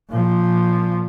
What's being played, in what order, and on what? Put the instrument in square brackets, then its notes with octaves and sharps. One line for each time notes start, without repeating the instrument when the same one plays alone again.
[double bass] A#2 F3